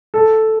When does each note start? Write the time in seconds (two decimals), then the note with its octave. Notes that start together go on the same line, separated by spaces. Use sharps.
0.14 A4